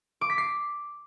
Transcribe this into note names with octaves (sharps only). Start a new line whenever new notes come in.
D6
B6
C7